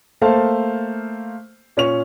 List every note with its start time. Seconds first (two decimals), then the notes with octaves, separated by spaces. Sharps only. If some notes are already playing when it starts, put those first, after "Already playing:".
0.21 A3 A#3 A4 C5 F5 A5
1.77 A#2 C#4 C#6 F7